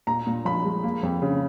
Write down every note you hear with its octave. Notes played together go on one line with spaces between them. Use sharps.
A#2 A#5
A#2
F3 B5
G#3
A#3
F2
C#3